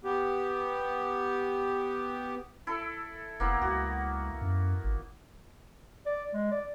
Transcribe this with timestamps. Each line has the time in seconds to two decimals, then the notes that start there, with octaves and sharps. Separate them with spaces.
0.04 B3 G4
2.67 E4 A4
3.40 F1 A#3 B3 E4
3.62 C#2 F#4
4.41 F#2
4.84 G#1
6.06 D5
6.34 G#3
6.51 D5